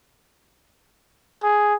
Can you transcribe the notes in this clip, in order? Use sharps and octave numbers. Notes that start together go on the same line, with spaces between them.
G#4